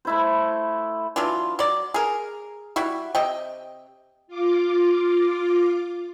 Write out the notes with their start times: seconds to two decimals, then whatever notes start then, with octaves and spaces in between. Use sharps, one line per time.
0.05 A3 E4 C5
1.16 E3 F#3 D4 F4
1.59 F#3 D5
1.94 G#4 A#4
2.76 G3 E4 F#4
3.15 C3 D#5 G5
4.27 F4 D6